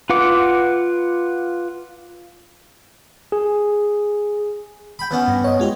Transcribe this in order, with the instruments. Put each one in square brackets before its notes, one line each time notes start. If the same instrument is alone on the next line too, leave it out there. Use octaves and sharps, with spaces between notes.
[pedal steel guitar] F4 B4 F#5 D6
[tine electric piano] G#4
[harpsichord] G5 B5
E3 B3 C#4
[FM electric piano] G2
C#5 D#5
G#3 F4 G4